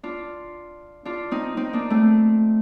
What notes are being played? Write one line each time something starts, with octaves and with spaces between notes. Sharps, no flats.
D4 F4
D4 F4
C4 D#4
C4 D#4
A#3 D4
A3 C4